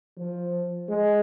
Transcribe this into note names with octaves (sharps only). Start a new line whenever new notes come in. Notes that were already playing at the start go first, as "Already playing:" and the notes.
F3
G#3